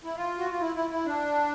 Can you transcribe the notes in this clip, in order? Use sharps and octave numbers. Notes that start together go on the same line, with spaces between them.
E4
F4
F#4
F4
E4
E4
E4
D4